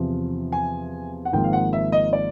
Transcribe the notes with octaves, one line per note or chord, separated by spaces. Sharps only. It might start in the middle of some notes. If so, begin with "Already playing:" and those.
Already playing: E2 C3 F3
G#5
F#5
G#1 G#2 F3 A#3 G5
F5
F#5
E5
D#5
D5